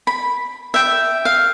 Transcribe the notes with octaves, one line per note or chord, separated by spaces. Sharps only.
B5
E5 G5
F5